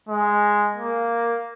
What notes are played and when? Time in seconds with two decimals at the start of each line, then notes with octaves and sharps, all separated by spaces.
0.09 G#3
0.76 A#3